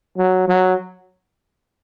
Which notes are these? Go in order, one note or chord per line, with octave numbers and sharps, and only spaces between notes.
F#3
F#3